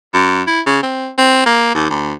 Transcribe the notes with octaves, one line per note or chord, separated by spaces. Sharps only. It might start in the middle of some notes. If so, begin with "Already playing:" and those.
F#2
E4
C#3
C4
C4
A#3
D#2
D2